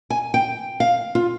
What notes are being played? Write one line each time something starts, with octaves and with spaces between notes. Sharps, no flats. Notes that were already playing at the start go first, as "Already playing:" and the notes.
G#5
G5
F5
F4